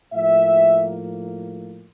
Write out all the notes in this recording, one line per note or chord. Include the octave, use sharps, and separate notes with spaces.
A2 F3 A#3 E5